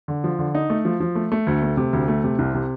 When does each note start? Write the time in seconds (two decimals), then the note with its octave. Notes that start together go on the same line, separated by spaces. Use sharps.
0.08 D3
0.24 F3
0.39 D3
0.55 D#4
0.70 A3
0.85 F3
1.00 F3
1.15 A3
1.32 A3
1.47 D2
1.62 A3
1.77 C3
1.93 D2
2.08 A3
2.24 C3
2.39 C2
2.54 C3